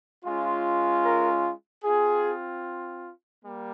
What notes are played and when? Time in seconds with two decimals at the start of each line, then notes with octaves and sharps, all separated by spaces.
0.25 G#3 C#4 F4
1.04 A#4
1.84 C4 F4 G#4
3.43 G3 A#3